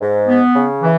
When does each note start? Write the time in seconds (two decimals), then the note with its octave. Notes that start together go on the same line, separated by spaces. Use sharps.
0.01 G#2
0.27 B3
0.54 C#3
0.82 E3